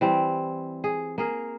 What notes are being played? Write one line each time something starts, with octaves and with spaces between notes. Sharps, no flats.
E3 G3 C4
G#4
A#3 G#4 A#4